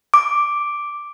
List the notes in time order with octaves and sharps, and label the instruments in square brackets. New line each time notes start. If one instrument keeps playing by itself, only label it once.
[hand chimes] D6